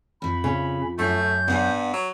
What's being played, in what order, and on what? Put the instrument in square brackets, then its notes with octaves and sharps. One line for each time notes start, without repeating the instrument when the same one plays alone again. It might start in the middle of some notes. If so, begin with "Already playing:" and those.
[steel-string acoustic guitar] F2 F3 [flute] B5
[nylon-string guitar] C#3
[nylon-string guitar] F#2 [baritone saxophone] A3 [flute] G6
[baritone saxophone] G2 [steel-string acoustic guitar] B3 F#5 G#5
[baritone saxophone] F#3